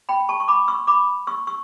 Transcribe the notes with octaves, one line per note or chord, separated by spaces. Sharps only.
G5 B5
A5 C#6
C#6
B5 D6
C#6 E6
B5 D6
C#6 E6
C#6 E6